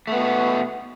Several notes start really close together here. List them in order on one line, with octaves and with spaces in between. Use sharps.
A3 B3 B2